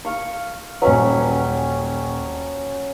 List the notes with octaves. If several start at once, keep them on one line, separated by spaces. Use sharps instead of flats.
F5 C#6
D#1 F#3 C#4 B4